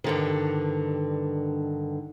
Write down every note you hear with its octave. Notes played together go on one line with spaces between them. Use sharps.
G2 D3 D#3